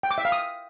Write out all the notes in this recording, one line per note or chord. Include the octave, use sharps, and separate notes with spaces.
G5
D6
E5
F5
D#6